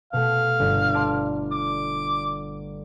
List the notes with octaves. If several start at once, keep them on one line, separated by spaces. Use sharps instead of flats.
B2 A3 F5
G1
D5 A5 C6
D6